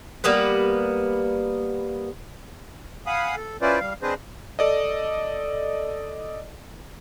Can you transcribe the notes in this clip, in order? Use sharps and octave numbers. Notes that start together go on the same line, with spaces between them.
G3 A#3 B3 B4
F5 F#5 G#5 B5 D#6
A4
C#4 E4 F4 B4 C5 D5
G3 F5
C4 D4 G#4 B4 C5 D#5
A4 D5 D#5